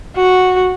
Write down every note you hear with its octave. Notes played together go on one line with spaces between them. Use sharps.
F#4